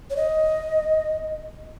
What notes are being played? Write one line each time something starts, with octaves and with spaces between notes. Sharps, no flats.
C#5
D#5